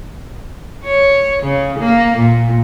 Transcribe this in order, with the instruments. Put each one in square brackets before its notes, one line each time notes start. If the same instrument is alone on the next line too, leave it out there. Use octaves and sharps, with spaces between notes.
[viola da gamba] C#5
C#3
A#3
A#2